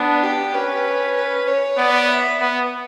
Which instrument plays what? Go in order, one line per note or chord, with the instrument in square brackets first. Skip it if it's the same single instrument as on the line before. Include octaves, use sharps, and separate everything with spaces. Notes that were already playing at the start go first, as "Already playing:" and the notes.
Already playing: [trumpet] B3 [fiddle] D4
[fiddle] G4
[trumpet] C#4 [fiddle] B4
[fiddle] B4
C#5
[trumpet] B3 [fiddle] D5
[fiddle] E5
[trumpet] B3